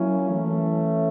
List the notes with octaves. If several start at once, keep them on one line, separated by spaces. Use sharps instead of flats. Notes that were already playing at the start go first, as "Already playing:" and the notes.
Already playing: F#3 A#3 C#4 E4
E3 A3 C#4